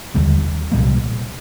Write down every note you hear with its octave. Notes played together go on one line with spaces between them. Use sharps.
D#2 D3 G3 C4
C2 A#2 G3 A#3